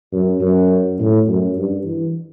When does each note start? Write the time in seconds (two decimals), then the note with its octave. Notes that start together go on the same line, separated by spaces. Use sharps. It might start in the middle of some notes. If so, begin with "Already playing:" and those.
0.12 F#2
0.41 F#2
0.99 A2
1.28 F#2
1.56 G2
1.84 E3